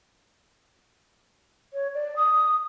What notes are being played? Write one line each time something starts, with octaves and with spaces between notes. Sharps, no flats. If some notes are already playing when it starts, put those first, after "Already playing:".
C#5
D5
D#6